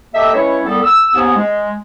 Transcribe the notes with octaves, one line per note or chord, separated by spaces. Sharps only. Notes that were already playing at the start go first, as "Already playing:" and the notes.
A#3 G4 A4 D#5 E5
G#3 C#4 E4 B4 C#5
C2 G3 B3 A4
E6
D#2 G#2 B3 C#4
G#3